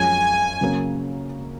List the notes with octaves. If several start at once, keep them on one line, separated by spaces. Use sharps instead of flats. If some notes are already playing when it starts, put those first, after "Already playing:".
Already playing: F#2 F3 G#3 C#4 F4 G#5
C#3 F#3 A#3 C#4